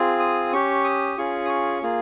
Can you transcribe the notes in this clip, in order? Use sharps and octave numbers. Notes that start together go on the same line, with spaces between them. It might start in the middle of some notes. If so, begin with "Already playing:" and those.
Already playing: C4 F4 G#4
D#6
C#4 G4 C#6
D#6
C#4 F4 G#4 C#6
D#6
C#6
A#3 F4 G#4